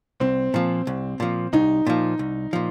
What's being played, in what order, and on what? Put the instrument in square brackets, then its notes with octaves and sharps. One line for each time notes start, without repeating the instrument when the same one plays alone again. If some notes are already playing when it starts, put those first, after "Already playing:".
[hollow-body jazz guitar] C2 [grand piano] C4
[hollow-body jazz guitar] A#2 F3
C2
A#2 F3
[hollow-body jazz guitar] C2 [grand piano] D#4
[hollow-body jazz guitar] A#2 F3
C2
A#2 F3